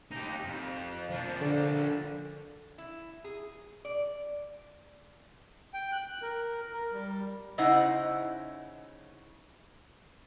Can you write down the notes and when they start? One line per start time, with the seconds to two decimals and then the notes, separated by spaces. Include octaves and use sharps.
0.12 D#4 G4
0.44 F2
1.10 F3 D4
1.41 D3
2.78 E4
3.24 G#4
3.85 D5
5.74 G5
5.92 F#6
6.22 A#4
6.73 A#4
6.93 G3
7.58 C#3 D#4 E4 C5 D#5 F#5